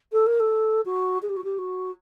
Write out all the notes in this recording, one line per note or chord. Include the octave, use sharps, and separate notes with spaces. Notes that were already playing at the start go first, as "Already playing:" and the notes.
A4
A#4
A4
F#4
G#4
G4
F#4
G4
F#4